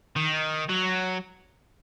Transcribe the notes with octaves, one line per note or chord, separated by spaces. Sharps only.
D#3
F#3